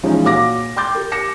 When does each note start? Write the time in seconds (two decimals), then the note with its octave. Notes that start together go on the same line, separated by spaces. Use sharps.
0.03 E3 F3 G3 G#3 C#4 D#4
0.23 A#2 F#4 C#5 F5 D6 A#6
0.76 G5 C6 D6 G6 A6
0.95 G4 A#4
1.12 D6 A#6 C#7 E7